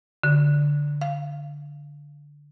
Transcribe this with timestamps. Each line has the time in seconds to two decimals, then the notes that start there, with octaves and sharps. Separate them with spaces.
0.23 D3
1.01 F5